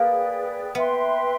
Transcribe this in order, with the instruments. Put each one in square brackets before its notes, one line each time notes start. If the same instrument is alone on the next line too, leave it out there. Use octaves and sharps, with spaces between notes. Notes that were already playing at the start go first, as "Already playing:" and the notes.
Already playing: [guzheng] A#3 [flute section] G#4 B4 D5 G5
[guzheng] B3 [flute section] B4 E5 G5 C6